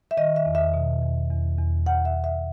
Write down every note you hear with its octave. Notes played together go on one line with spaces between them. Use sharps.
E5
D#3 D#5
E5
E2
E5
B2
E2
E2
E2
E2 F#5
E5
E2
E5